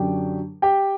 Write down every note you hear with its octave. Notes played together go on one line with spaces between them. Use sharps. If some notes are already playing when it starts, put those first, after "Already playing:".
Already playing: F#2 D3 F#3 G4 G5
G4 G5